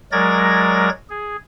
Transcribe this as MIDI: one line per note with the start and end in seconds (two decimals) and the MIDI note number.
0.12 0.89 54
0.12 0.89 56
0.12 0.89 70
0.12 0.89 74
0.12 0.89 92
0.12 0.89 94
1.10 1.36 68